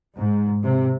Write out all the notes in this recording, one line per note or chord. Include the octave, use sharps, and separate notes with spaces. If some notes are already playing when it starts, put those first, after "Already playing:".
G#2
C3